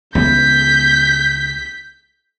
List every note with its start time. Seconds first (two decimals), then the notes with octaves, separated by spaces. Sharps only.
0.15 C#2 E3 B3 G6 B6